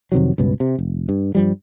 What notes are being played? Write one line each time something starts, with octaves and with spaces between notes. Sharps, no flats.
F2 C3 D#3 F#3
C#2 G2 B2 B3
C3
F1
G2
G2 F3 G3